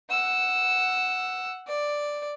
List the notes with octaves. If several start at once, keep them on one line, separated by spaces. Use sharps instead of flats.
F#5 E6
D5